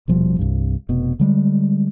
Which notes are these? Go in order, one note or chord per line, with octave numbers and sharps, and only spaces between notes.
D#1 B2 F3 G3
C2 G2
F1 B2
D3 G3 G#3